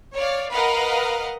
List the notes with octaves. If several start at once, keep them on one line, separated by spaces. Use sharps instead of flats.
C#5 D5 F5
A#4 B4 D#5 F5 F#5